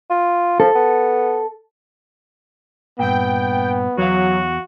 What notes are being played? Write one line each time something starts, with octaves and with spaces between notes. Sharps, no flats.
F4
F3 A4
B3
G2 A#2 B3 G5
E2 F#3 F#4 F5